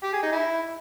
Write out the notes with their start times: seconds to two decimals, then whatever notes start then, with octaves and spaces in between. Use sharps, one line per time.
0.03 G4
0.13 G#4
0.23 D#4
0.32 E4